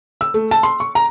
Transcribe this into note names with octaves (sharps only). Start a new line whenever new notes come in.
E6
A3
A5
C6
C#6
A#5